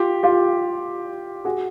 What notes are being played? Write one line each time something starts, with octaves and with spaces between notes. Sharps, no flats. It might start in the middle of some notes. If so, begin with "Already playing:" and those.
Already playing: F4 G4
F4 G4
F#4 G#4